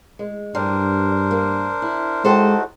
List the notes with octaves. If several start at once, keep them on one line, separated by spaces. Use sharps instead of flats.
G#3
G2 G3 D4 A#4 C5
A#3
E4
G#3 A3 D#4 F#4 G4 A4 C5